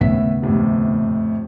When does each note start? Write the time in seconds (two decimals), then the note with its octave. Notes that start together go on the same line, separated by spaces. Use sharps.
0.01 D#2 A2 C#3 B3 E5 B6
0.42 F2 A2 C3